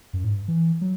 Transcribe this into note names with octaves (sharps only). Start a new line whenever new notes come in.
F#2
A2
G2
E3
F#3